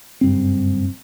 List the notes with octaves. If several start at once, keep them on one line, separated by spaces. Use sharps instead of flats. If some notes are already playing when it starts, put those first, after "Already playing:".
F#1 G2 C4